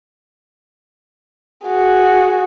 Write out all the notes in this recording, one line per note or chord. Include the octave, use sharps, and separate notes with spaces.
F#4 G#4